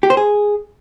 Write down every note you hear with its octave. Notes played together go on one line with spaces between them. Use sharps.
G4
C5
G#4